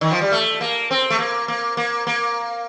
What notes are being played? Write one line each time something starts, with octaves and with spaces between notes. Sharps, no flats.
D#3
F3
G3
A3
A#3
C4
A3
A#3
A#3
A#3
A#3